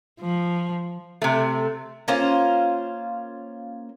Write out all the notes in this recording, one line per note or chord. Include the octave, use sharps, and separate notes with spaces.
F3
C3 A3
A#3 C#4 F4 C5